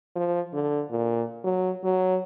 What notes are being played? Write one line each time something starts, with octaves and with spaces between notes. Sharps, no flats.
F3
D3
A#2
F#3
F#3